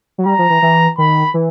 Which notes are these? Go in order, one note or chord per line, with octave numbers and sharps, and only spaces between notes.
F#3
G3 A#5
F3
E3
E3
D#3 B5
E3